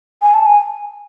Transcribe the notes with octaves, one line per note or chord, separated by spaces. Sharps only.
G#5
A5
G#5